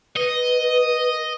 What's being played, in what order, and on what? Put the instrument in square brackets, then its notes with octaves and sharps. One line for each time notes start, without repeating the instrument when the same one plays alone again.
[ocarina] B4 [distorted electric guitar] D#5